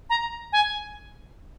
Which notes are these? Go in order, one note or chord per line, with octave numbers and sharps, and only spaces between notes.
A#5
G#5